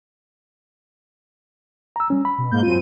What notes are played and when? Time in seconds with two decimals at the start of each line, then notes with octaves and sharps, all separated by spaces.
1.96 A#5 E6
2.10 G3 C#4
2.25 B5
2.38 B2
2.51 G#2 A#3 G6
2.63 F#2 C4 F4 D#7